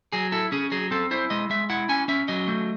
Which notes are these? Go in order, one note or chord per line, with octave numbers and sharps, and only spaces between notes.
F#3 G#4
E4 A4
C#4 G#4
F#3 G#4
C4 A4
E4 C5
G#3 D#5
G#3 E5
E4 F#5
C#4 G#5
C#4 E5
F#3 D#5
A3